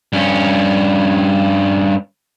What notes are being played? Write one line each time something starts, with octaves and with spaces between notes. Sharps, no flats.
G2 C#4